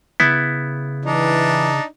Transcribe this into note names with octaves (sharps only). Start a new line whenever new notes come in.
C#3 B3 E4
E3 D4 D#4